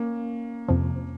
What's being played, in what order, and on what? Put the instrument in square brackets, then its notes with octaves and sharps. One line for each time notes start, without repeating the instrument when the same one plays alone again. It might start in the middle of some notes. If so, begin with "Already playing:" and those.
Already playing: [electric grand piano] A#3 C#4
[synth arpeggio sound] F2 C3 F3